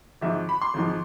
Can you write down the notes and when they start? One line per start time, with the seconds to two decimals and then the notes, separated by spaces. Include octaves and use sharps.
0.21 G#1 G#2 F3 E5
0.49 B5
0.62 C6
0.74 G#1 G#2 F3